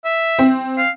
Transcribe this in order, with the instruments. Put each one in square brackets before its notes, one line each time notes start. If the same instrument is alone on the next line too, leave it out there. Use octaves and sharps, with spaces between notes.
[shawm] E5
[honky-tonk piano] C4
[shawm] F5